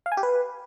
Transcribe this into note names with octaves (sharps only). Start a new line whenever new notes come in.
F5
G#5
G4
B4